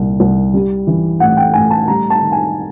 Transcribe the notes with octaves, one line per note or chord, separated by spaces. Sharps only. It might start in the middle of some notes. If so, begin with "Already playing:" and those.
Already playing: C2 A#2
C2
G3
E3
A2 F#5
G5
A2 G#5
A5
G3 A#5
A5
D#3
G#5